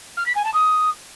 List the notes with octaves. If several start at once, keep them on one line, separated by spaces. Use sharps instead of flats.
F6
B6
G#5
A5
D#6